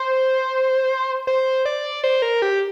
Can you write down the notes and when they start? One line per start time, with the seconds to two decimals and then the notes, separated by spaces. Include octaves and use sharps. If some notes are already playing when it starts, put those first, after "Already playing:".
Already playing: C5
1.27 C5
1.65 D5
2.04 C5
2.22 A#4
2.42 G4